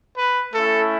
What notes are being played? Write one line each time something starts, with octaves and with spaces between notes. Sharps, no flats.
B4
A3 C#4 E4 A4